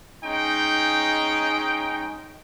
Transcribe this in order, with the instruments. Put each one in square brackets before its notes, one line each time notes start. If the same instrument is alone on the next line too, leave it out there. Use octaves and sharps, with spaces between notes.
[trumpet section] G#3 C#4 D#4 G5